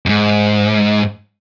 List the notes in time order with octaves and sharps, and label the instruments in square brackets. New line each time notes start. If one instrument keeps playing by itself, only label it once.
[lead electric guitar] F2 G#2